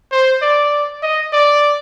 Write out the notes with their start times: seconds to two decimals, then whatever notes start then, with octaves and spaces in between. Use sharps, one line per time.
0.11 C5
0.42 D5
1.03 D#5
1.33 D5